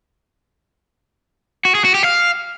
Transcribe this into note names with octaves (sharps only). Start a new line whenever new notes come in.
F#4
G#4
F#4
G4
F5